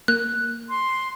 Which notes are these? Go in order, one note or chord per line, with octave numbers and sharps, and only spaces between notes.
A#3 F#6
C6